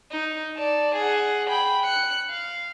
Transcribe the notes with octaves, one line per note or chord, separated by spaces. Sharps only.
D#4
D5 A5
G#4 F#5
G5 B5
F#6 C#7
F5